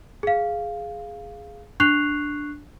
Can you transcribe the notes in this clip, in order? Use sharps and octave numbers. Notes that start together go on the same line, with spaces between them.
G#4 F5
D4 C#6 F#6 C7 F7